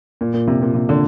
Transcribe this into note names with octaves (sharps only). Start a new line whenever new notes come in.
A#2
A#2
C3
A#2
C3
D3